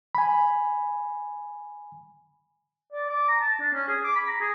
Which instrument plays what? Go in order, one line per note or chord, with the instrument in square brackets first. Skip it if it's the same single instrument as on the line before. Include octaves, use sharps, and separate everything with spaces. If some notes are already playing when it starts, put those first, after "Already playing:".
[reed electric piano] G#5 B5
[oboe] D5
D6
A#5
A5
D4
C#4
G#4
D6
B5
A#5
G#4